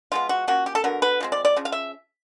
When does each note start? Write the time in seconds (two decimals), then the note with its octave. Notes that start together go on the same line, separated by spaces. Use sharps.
0.12 F3 G#3 B3 F4
0.29 F#4
0.48 F3 A#3 C#4 F#4
0.66 G4
0.75 A4
0.84 D3 F#3 B3 A#4
1.02 B4
1.20 F3 G#3 C4
1.32 D5
1.45 D5
1.57 C#3 F3
1.65 F5
1.72 E5